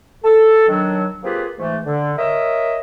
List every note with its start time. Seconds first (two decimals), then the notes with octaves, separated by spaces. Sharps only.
0.24 A4
0.69 D#3 F#3 D4
1.24 A#3 C4 F4 G4 G#4 B4
1.59 G#2 E3 A3
1.85 D3
2.18 A#4 C#5 D#5 E5